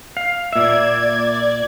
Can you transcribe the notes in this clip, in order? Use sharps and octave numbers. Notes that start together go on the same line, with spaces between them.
F5
A#2 D5 E5 G#6